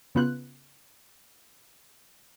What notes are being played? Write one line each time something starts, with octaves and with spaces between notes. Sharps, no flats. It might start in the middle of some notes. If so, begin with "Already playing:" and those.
C#3 B3 F4 F#6